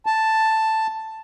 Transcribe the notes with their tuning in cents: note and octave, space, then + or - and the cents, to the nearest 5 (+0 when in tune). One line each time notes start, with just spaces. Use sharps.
A5 +5